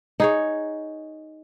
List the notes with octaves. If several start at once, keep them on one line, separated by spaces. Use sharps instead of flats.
D#4 G#4 C#5